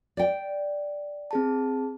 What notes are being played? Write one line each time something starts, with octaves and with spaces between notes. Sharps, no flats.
D5 G5
C4 G#4 A5